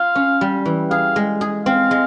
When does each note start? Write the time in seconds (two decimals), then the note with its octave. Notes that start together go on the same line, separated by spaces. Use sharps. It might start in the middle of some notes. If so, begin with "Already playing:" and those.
Already playing: F4 F5
0.15 C#4
0.41 G3
0.65 E3
0.90 G#4 F5
1.16 G#3
1.41 G#4
1.66 C4 F5
1.91 G#3